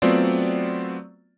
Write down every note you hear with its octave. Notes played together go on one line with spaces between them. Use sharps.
F#3 A3 B3 C4 F4 D5